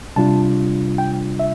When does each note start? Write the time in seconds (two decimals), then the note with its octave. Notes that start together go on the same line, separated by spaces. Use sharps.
0.16 C3 G3 D4 F4 A5
0.98 G5
1.39 E5